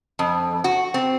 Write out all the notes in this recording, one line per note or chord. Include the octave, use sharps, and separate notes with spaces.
F2
F#4
C4